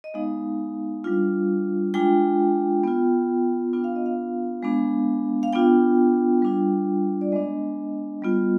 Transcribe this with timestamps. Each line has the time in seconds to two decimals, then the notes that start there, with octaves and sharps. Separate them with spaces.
0.04 D#5
0.14 G#3 B3 D#4 F5
1.04 G3 D4 F4
1.94 G#3 D4 F4 G5
2.84 B3 F4
3.73 B3 D4 F4 G5
3.84 F5
3.96 D#5
4.06 F5
4.62 G#3 B3 D4
5.43 F5
5.53 B3 D4 F4 G5
6.42 G3 D4 F4
7.21 D5
7.32 G#3 B3 D4 D#5
8.22 G3 B3 F4